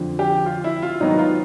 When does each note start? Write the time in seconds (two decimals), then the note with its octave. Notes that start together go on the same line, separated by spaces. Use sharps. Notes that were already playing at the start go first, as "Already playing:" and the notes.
Already playing: F2 D3 F3
0.19 G4
0.46 F4
0.64 E4
0.82 F4
1.01 G#2 D#3 F#3 B3 D#4
1.19 F4